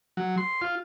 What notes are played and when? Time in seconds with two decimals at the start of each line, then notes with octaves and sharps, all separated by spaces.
0.17 F#3
0.38 C6
0.62 F4